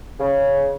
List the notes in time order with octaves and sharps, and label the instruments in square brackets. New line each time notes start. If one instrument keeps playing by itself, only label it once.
[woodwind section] C#3